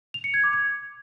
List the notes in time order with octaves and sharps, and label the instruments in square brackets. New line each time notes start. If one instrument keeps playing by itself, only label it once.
[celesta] F7
C#7
G#6
D6
G#6